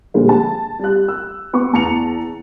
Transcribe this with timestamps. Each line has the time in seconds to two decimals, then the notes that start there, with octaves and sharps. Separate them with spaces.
0.14 A#2 D3 F3 G3 G#3 A#3
0.29 A5
0.79 G3 F#6
1.08 E6
1.53 B3 C#6 D6
1.73 E2 A5 A#5 C#7 F7